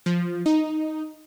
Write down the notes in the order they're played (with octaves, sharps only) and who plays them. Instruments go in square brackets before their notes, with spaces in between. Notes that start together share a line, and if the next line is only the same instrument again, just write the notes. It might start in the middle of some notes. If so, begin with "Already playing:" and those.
[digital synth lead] F3
D#4